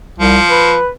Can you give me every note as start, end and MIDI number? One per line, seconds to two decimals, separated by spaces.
0.19 0.38 36
0.19 0.78 53
0.50 0.89 71